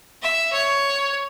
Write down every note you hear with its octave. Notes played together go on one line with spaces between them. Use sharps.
E5
C#5